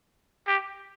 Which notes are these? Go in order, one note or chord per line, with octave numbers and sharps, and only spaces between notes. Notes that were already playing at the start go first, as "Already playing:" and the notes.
G4